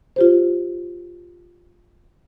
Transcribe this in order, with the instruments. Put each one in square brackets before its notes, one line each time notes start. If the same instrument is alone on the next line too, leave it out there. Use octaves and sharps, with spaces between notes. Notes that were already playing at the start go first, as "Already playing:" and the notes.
[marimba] F4 G4 C5